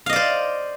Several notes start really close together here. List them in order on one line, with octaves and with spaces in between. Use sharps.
F5 D#5 D5 C5